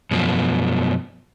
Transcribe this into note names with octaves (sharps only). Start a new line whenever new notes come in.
F#2 B2 F3